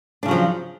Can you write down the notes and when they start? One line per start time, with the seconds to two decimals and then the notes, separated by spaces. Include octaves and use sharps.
0.23 D4
0.25 C#3
0.28 F#3
0.31 F3